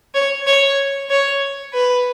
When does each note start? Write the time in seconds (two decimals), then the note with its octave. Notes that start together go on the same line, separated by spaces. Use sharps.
0.14 C#5
0.47 C#5
1.10 C#5
1.73 B4